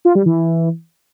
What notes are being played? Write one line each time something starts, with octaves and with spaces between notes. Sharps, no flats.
F4
G3
E3